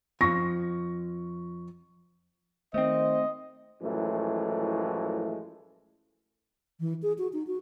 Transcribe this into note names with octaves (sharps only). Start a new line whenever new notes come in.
F2 F3 C#6 A#6
D#3 A3 C4 C5 D#5
F#2 A2 E3 F3 G#3 A3
E3
G#4
F#4
D#4
F#4